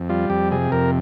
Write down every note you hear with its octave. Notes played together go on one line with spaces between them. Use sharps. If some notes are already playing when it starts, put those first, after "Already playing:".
Already playing: F2
G3 F4
F2 G4
C3 G#4
F2 A#4